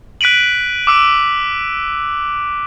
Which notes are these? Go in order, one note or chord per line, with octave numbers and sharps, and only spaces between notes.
F#6 B6 D7 D#7 F#7
D6 E6 D7